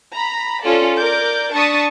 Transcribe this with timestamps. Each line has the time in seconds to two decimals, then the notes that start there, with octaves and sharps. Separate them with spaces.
0.13 A#5 B5
0.63 C#4 F4 A4 D5
0.98 A#4 D5 D6 G6
1.53 D4 A5 C#6 D#6 A6 B6